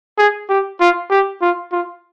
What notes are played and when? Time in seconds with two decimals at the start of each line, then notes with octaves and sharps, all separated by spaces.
0.18 G#4
0.50 G4
0.80 F4
1.11 G4
1.42 F4
1.72 F4